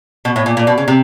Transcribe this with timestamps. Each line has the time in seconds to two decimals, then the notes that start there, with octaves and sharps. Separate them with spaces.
0.25 B2
0.36 A2
0.46 A#2
0.57 A#2
0.67 B2
0.78 C#3
0.88 C3